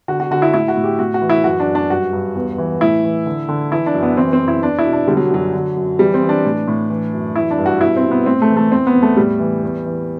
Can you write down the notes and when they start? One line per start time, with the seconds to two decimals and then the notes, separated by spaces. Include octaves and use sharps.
0.08 D3 F#4
0.20 F#4
0.31 D3 F#4
0.42 E4
0.54 A2 E4
0.68 F#4
0.77 A2
0.84 G4
0.99 A2 F#4
1.14 F#4
1.22 E3
1.29 E4
1.44 F#2 F#4
1.60 D4
1.67 F#2
1.75 D4
1.90 G2 F#4
2.13 G2
2.35 E2
2.58 E3
2.81 A2 E4
3.04 E3
3.26 D3
3.49 D3
3.72 E3 E4
3.86 D4
3.95 F#2
4.03 B3
4.17 E3 C4
4.33 C4
4.40 F#2
4.48 E4
4.63 E2 D4
4.79 E4
4.85 B2
4.93 D4
5.08 D3 G3
5.17 F#3
5.31 F#2 F#3
5.53 D3
5.77 F#2
5.99 E3 G3
6.14 C4
6.22 E3
6.29 D4
6.45 A2
6.68 A2
6.90 E3
7.13 F#2
7.35 E3 E4
7.51 D4
7.58 G2
7.66 F#4
7.80 B2 E4
7.96 C4
8.04 B2
8.11 B3
8.26 A2 C4
8.42 A3
8.50 E3
8.57 A3
8.72 E2 C4
8.87 B3
8.94 E2
9.02 A3
9.17 A2 G3
9.39 E3
9.63 E2
9.86 E3